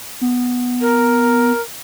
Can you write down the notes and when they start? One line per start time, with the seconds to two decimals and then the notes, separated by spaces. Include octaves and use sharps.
0.21 B3
0.81 A#4